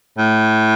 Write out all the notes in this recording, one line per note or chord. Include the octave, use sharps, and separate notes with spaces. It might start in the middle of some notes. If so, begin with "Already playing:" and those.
A2